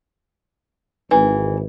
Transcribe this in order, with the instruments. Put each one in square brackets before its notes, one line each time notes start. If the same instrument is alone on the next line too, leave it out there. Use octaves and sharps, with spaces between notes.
[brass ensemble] G#1 [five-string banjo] E3